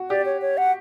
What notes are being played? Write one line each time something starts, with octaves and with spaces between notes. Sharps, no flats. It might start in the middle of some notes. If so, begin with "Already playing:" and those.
Already playing: F#4
G4 D5
C#5
C#5
F#5